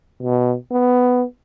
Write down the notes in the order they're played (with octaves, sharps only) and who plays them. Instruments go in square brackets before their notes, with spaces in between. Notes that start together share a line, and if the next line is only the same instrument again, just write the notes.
[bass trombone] B2
B3